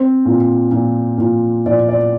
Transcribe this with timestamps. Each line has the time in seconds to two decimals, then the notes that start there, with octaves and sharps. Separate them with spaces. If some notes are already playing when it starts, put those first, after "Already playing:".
Already playing: C4 C5
0.25 A#2
0.71 A#2
1.18 A#2
1.66 A#2 D5
1.89 D5